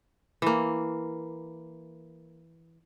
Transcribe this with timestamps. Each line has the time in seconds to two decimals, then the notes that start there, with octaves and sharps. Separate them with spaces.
0.42 E3 A#3